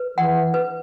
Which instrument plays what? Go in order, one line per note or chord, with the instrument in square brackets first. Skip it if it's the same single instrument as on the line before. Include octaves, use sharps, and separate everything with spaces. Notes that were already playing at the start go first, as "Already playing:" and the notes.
Already playing: [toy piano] B4
[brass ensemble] E3 [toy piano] F#5
[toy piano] B4